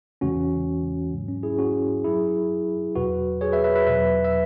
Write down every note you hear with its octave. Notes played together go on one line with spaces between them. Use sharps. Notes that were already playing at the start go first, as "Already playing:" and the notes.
E2 C#3 E3 G#3 C#4 F#4
G#2 F#3
C#4
E4 G#4
C#4 F#4
F#2 F#3 E4 G#4
E2 B2 F#3 F#4 B4
G#4 C#5
B4 E5
B4 E5
B4 E5
E2 B2 F#3 B4 E5
E5